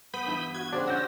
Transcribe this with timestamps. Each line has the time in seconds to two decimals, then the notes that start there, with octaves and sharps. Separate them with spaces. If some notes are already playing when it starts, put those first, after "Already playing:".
0.14 B3 B5 D#6 G6
0.26 G2 E3 E5
0.54 F#4 G#6
0.72 C#3 C4 D4 D5
0.87 C#4 F#4 G4 D5 F#5 E6 G6 A#6